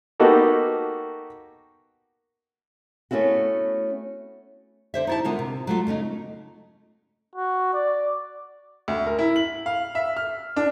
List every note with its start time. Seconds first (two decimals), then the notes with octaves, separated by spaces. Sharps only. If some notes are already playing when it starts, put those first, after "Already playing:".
0.20 A#3 B3 D#4 F#4 G4 A4
3.11 A3 B3 C#4 E4 F#4
4.94 D3 C5 E5
5.07 D#4 E4 A5
5.24 D3 B3 F4 A#4
5.39 C3
5.67 F#3 A3 F4
5.87 C#3 A3 C#4 D#4
7.35 F#4
7.73 D5
8.88 D2
9.06 A#4
9.19 E4
9.36 F#7
9.66 F5
9.95 E5
10.17 F6
10.56 D4